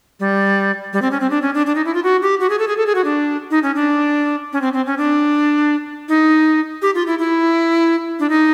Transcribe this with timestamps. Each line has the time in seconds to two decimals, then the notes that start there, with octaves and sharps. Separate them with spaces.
0.20 G3
0.93 G3
1.02 C4
1.11 C#4
1.21 C4
1.30 D4
1.42 C#4
1.54 D4
1.66 D4
1.75 D#4
1.85 E4
1.94 F4
2.04 F#4
2.22 G4
2.40 F#4
2.50 G#4
2.59 A4
2.67 G#4
2.77 A4
2.86 G#4
2.95 F#4
3.04 D4
3.51 D#4
3.63 C#4
3.75 D4
4.53 C#4
4.62 C4
4.73 C4
4.86 C#4
4.98 D4
6.09 D#4
6.82 G4
6.95 F4
7.07 E4
7.19 E4
8.19 D4
8.30 D#4